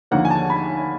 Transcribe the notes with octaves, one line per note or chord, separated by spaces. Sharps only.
D#2 D3 F3 A#3 F#5
G#5
A5
B5